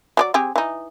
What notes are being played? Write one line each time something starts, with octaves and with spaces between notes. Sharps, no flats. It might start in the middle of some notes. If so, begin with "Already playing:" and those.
F#3 G4 D5
C4 G4 G#4
E3 D#4